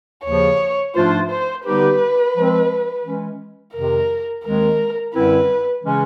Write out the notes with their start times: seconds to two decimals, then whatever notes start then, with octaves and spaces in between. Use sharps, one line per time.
0.25 D#2 C#3 F3 C#5
0.95 G#2 F3 A3 D4 F4 C5
1.30 C5
1.65 D3 G3 B3 D#4 G4 B4
2.35 F3 G#3 C4
3.04 E3 G#3 C#4
3.74 F2 C3 D#3 G#3 A#4
4.44 D#2 D#3 G#3 C4 A#4
5.14 F#2 D3 G3 C4 E4 B4
5.84 C#3 E3 G#3 C#4